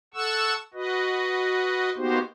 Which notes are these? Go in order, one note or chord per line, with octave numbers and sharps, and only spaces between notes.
A4 F#5 C#6 E6
F#4 B4 D#5
A#3 B3 D#4 F#4 G4 C5